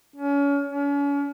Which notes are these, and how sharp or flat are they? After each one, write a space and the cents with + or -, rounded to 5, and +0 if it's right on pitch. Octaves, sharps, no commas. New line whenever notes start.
C#4 +30
C#4 +40